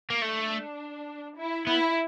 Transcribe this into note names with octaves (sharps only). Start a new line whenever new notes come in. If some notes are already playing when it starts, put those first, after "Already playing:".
A#3
A3 D4
E4
B3 E4